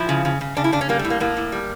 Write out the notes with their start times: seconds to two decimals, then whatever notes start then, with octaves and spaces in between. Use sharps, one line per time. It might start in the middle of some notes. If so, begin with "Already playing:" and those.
Already playing: F3 E4
0.09 C#3
0.25 C#3
0.41 C#3
0.57 C#3 D4
0.64 E4
0.72 C#3 D4
0.81 C#4
0.89 G3 A#3
0.99 A3
1.04 A2
1.10 A#3
1.20 A2 A#3
1.37 A2
1.52 G3